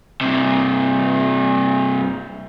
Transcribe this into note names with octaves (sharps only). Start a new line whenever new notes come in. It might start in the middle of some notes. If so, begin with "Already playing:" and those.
G2 C3